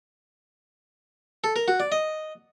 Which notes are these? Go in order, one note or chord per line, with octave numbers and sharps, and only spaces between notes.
A4
A#4
F#4
D5
D#5